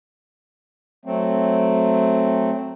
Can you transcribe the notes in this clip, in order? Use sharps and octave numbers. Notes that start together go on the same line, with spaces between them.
F#3 A3 C4